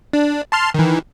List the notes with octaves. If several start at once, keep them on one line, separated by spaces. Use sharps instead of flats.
D4
A5 C6 F6
D#3 E3